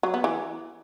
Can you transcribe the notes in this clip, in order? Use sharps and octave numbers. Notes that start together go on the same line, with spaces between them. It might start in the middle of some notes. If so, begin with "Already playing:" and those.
F#3
B3
E3